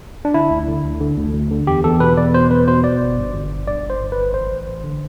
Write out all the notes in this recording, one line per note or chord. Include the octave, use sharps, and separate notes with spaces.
D4
D3 E4
D2
D3
D2
D3
D2
D2
D3
E2 G4
E2 A4
B2 B4
E2 D5
B2 C5
E2 B4
B2 C5
B2 D5
G1
G2
G1
G2
G2 D5
G1
C5
G1
B4
G1
A1 C5
A1
A1
D3